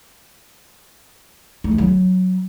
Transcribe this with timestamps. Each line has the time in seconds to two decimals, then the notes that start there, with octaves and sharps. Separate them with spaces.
1.64 A3
1.71 E3
1.78 F#3